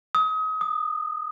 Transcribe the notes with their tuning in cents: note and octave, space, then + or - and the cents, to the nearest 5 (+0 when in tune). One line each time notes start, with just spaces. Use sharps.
D#6 +35
D#6 -25